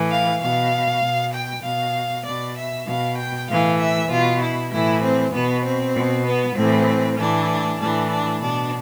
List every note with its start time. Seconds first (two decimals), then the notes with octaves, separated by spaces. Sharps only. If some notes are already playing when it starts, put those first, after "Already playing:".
Already playing: A2 E3
0.10 F5
0.41 B2 F5
1.03 B2
1.33 G5
1.64 B2 F5
2.25 B2 D5
2.57 E5
2.87 B2 F5
3.17 G5
3.49 A2 E3 F5
3.79 E5
4.10 B2 F4
4.41 E4
4.72 A2 E3 E4
5.02 C4
5.33 B2 B3
5.64 C4
5.95 B2
6.26 B3
6.56 A2 E3 C4
7.17 A2 E3 D4
7.79 A2 E3 D4
8.10 D4
8.41 B2 D4